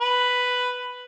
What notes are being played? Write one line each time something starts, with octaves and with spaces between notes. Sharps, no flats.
B4